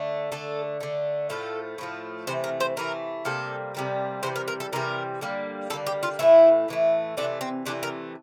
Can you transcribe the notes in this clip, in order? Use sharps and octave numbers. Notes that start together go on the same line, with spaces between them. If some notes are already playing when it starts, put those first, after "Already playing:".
Already playing: D3 A3
D3 A3 A4
D3 A3
A2 F3 A3 A4
A2 F3 A3
C3 E3 A3 C5
A#4
C5
C3 E3 A3 A#4
C3 G3 A#3 A4
C3 G3 A#3
C3 E3 G3 C5
A#4
A#4
A4
C3 E3 G3 A#4
D3 G3 A#3
D3 G3 A#3 A4
G4
F4
A2 E3 A3 E4
A2 E3 A3
C3 E3 A3 D4
C4
C3 E3 A3 D4
A#4